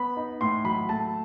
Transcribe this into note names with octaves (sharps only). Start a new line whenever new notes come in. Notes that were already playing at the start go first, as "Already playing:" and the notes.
Already playing: B3 B5
D#4
A2 C6
F#3 B5
A3 A5